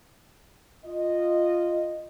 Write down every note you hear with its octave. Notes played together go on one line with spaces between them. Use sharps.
F4 D#5